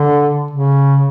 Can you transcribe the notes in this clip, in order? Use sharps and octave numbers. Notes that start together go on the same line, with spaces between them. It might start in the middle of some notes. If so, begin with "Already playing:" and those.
Already playing: D3
C#3